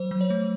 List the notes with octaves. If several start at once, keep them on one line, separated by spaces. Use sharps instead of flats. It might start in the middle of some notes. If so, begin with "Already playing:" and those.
Already playing: F#3 C5
F#3
C#5
A3